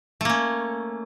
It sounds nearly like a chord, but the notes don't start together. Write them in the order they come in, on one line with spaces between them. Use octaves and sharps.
A3 A#3 C#4